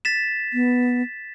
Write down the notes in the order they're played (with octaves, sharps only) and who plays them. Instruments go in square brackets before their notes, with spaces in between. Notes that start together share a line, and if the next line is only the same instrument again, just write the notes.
[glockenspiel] A6 B6 E7
[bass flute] B3